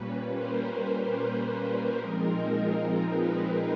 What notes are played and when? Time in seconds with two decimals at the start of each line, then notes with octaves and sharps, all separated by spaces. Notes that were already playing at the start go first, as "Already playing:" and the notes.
Already playing: A#2 G3 A#3 C#4 B4
0.33 A#4 C5
1.43 B4
1.98 A#2 F3 G#3 C4 D#4 A#4
3.08 B4